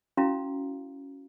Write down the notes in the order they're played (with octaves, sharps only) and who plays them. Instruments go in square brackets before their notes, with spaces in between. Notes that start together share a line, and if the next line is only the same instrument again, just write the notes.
[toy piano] C#4 E4 F#4 F5 A#5